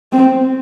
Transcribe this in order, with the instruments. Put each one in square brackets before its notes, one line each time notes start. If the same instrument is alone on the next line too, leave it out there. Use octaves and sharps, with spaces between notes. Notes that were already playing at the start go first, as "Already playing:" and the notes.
[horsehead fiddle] C4